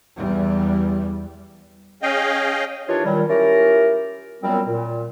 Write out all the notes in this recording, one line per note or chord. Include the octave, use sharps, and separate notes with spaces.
E2 G3
C#4 G#4 D#5 F5 G5
D#3 E3 D4 F4 G4 C#5
A#2 D#3 F#3 G3
C#4 E4 F4 G4 A#4
F#2 A#2 F#3 G3 B3 C4
A#2